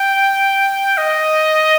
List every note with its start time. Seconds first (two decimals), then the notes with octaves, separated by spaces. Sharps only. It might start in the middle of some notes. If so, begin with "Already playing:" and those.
Already playing: G5
0.97 D#5